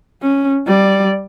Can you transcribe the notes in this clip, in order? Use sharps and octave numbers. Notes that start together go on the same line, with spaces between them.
C#4
G3 D5